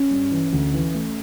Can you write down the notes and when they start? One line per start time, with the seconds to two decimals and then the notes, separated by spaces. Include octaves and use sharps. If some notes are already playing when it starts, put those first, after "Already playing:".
Already playing: C#4
0.11 G2
0.31 E3
0.53 D2
0.74 E3
0.94 A3